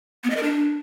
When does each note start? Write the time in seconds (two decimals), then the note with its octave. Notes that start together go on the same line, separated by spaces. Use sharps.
0.24 B3
0.30 D#5
0.37 A#4
0.43 D4